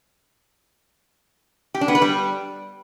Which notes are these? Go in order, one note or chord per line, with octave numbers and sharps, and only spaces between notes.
G4
D4
B3
B4
G3